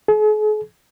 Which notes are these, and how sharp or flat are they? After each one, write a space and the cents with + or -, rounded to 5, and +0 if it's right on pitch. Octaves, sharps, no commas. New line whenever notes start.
G#4 +45